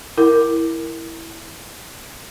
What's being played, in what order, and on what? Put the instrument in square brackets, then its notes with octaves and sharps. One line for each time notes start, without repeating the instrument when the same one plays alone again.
[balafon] E4 A#4